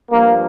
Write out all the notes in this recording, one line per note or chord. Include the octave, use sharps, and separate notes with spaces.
G2 F3 A#3